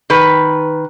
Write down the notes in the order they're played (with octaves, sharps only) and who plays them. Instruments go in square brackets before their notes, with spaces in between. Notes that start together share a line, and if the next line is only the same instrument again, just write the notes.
[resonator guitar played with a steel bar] D#3 B4